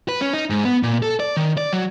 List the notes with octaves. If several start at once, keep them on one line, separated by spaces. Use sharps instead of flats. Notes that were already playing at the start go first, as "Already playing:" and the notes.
B4
C#4
D#4
G#2
B3
A#2
A4
D5
D#3
D5
F#3